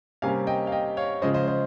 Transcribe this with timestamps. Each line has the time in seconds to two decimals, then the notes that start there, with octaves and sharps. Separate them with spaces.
0.22 C3 G3 A#3 C#4 F5 G#5
0.47 D#5 G5
0.67 F5
0.72 D#5 G5
0.97 C#5 F5
1.22 C#3 F3 G#3 C#4 C5 D#5
1.34 C5 D#5
1.47 C5 D#5